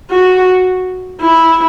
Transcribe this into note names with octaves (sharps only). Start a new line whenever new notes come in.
F#4
E4